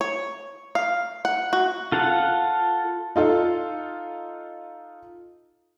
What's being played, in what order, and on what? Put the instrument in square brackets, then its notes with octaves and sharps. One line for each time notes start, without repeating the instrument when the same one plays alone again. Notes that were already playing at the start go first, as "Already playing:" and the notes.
[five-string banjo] C#5
F5
F#5
F#4
[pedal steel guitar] F4 A4 F5 F#5
[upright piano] D#4 F4 A4 F5